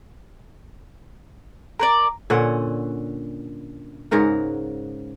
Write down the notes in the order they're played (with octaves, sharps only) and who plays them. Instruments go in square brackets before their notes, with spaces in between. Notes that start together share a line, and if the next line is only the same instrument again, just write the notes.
[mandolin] A#4 B4 D5 [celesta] A#5
[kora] A#2 D3 C#4 F#5
G#2 C#3 A#4 F#5